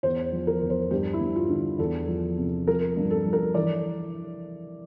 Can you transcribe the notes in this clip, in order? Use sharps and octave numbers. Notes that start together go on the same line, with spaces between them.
E2 C5
F3
A#4
E2
C5
G2 G4
E4
G2
F4
D3
E2 A4
F3
C3
F3 A#4
G2
A4
F3
A#4
E3 D5